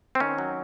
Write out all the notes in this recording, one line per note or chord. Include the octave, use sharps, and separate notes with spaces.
C4
D#3 C#4
F#3